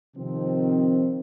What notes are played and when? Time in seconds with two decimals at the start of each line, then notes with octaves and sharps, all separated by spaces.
0.17 C3 D#3 F3 C4